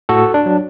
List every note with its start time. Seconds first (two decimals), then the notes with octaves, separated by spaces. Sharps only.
0.09 A2 F#4 A4
0.34 D4
0.46 F#3